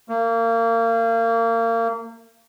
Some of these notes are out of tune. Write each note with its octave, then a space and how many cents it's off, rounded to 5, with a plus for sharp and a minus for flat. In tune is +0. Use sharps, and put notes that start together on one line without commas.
A#3 -30